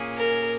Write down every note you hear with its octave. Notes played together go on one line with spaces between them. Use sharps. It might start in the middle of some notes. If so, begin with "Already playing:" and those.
Already playing: A#2 A#3 C#4 G#4
A#4